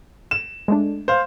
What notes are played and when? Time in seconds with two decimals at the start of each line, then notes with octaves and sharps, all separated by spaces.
0.31 E7
0.68 G#3 A3 D4
1.08 C5 F5